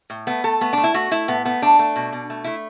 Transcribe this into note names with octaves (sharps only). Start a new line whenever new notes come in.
A2
A3 B3
A3 A4
A3 B3
A3 D4
E4
A3 F#4
A3 E4
A2 B3
A3 B3
A3 D4
A3
B2
B2
A3
A3 E4